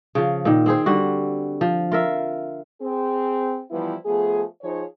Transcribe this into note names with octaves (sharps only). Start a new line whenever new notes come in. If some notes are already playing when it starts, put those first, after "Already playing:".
C#3 F3
A#2 D#3
C4 G#4 C5
D3 G3 F#4
F3
F4 A#4 E5
C4 G#4
E3 F3 G3 B3 E4
F3 A3 B3 G#4
F3 D#4 G#4 C5 C#5